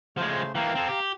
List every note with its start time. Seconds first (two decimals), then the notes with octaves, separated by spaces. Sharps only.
0.18 C#3 F3 G#3 A3 C5
0.55 E3 A#3 F5 G5 A#5
0.75 C4 A4
0.89 G4